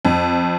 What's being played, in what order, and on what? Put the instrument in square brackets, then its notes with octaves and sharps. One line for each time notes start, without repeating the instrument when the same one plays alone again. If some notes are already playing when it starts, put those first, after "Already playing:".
[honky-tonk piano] F2